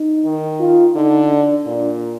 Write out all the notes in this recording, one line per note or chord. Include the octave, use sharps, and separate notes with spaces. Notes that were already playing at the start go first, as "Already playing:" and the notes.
Already playing: D#4
D#3
F4
D3 D#4
D4
A#2 D4